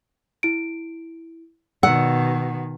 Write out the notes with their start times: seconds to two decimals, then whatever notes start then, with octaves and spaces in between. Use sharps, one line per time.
0.43 E4 D7
1.83 B2 D#3 F#5 E6